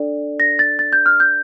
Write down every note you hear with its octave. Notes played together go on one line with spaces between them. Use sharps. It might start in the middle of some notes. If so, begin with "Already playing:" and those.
Already playing: D4 A4 D5
A#6
A6
A6
G6
F6
G6